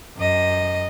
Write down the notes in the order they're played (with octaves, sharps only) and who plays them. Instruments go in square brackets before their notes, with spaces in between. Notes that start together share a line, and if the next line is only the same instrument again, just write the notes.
[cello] F#2 D#5